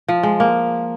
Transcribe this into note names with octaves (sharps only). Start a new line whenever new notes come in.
F3
G#3
A#3